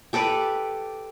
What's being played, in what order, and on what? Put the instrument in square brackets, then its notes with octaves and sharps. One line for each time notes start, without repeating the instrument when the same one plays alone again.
[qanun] G4 A4 B4 D5